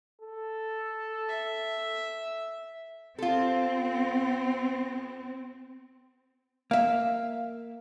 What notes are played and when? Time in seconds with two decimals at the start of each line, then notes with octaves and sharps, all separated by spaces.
0.21 A4
1.29 E5
3.18 C4 F4 A4
6.71 A#3 E5 F5